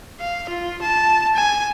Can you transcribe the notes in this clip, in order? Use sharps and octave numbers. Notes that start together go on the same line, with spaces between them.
F5
F4
A5
G#5